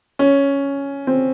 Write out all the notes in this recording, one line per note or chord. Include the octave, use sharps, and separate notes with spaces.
C#4
C4